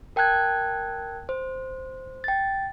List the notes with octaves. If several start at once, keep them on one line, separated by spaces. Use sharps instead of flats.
A#4 G5 A5 F#6 G#6
C5
G5 A6